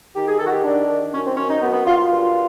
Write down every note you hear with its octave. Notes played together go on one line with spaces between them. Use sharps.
D#3 G4
G#4
D#3 A4
F#4
G4
D#3 D4
D#3
F#2 C#4
C4
F#2 C#4
D#4
F#2 B3
B3
F#2 F4
F4
G2